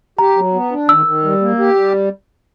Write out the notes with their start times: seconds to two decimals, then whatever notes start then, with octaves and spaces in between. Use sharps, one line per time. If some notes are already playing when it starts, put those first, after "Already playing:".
0.19 G4 A#5
0.37 F#3
0.53 B3
0.72 D4
0.89 D#3 E6
1.06 D#3
1.24 G3
1.42 A#3
1.59 G4
1.75 G3